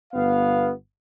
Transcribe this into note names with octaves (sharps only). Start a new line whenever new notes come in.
G1 B3 F5